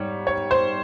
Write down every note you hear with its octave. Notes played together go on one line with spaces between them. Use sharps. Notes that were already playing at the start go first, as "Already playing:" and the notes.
Already playing: G#2 G3 C#5
C#5
C5